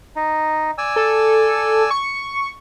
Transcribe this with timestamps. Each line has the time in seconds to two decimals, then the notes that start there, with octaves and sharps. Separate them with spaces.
0.16 D#4
0.78 D5 G#5 E6
0.96 A4
1.90 C#6